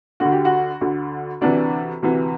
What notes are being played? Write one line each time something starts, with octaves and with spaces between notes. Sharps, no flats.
D2 D3 F#4
G4
F#4
D2 D3
D2 C3 E3 D4
D2 C3 E3